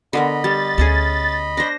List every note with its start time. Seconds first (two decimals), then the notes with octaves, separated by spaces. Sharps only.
0.13 D3 B3 A#4 D#5 B5
0.44 G3 A6
0.78 D2 A3 C#4 G#4
1.57 D4 C5 A#6